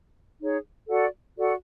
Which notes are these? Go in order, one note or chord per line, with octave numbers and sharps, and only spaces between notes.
D#4 G#4 C#5
F#4 A4 D5 F#5
F#4 A4 D5 F#5